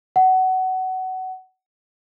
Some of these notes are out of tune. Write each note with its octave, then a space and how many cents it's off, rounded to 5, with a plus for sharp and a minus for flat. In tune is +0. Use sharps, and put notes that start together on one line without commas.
F#5 +20